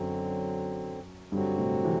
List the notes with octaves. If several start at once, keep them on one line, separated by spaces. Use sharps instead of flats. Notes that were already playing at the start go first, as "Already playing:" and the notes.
Already playing: F#2 D3 F#3 C4
G2 D3 F#3 C4 F#4
A2 C3
C3 E3